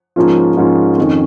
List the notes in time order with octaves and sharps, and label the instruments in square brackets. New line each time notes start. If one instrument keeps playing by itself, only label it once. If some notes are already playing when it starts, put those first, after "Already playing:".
[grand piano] G#2 F3 A#3 C#4 F4
G#2 F3 A#3 C#4 F4
F2 D#3 C#4